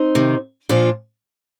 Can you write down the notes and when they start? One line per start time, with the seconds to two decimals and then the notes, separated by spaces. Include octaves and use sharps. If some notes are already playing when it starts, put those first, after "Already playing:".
Already playing: C4 D#4
0.15 C3 D#3
0.69 A#2 F3 D4 F4